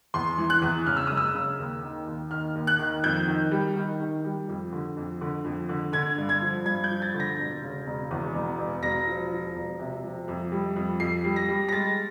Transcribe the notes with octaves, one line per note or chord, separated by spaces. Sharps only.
E2 C6
E3
F#6
E2
C#3 F6
E6
F#1 D#6
E6
C#3
D#2
D#3
D#2
D#3 F6
D#2
F#6
D#3
F2 G6
D#3
G3
D#3
D#3
G3
F2
D3
F2
D3
F2
D3
D3 G#6
G2
G#6
F3
G2 G#6
G6
F3
A6
D3
A#6
E1
C#3
E1
E2
E1
E1
E1 A#6
F3
F3
E1
C3
F3
F2
G3
F2
F2 C7
G3
A#6
G3
A#6
G#3 A6